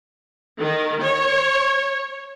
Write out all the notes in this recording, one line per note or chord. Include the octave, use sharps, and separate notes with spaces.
D#3
C#5